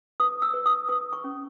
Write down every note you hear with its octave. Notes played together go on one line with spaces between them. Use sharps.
B4 D#6
E6
B4
D#6
B4 D#6
C#6
C#4